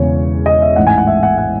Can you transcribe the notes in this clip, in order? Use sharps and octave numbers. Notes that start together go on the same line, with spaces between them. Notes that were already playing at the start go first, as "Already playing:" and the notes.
Already playing: E1 E2 C#3 E3 C#5
D#5
E5
A1 G#2 E3 F#5
G#5
F#5
E5
F#5
F#5